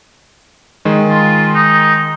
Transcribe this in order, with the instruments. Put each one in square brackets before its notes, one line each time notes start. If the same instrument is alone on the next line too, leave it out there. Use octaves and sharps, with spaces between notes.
[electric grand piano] D#3 G#3
[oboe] F4
D#4